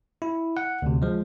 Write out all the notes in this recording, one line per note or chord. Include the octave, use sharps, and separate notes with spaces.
E4
F#5
D2 C3
F3 G#3